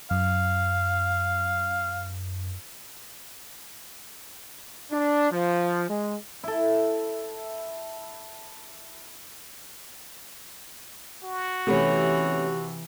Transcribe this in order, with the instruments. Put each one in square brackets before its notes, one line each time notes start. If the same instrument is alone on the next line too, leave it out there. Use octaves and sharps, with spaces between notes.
[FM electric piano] F#2 [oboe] F5
[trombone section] D4
F3
G#3
[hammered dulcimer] E4 A4
[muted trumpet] F#4
[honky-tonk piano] C3 [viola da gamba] E3 [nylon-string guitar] A3 B3 C#4